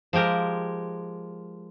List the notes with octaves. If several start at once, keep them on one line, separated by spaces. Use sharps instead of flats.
F3 G#3 G4 A#4